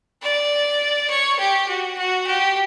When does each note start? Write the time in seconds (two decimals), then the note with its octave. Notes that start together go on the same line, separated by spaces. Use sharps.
0.23 D5
1.10 C#5
1.39 G4
1.68 F#4
1.98 F#4
2.26 G4